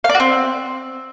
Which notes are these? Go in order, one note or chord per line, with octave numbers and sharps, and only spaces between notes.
F5
D5
F#4
C4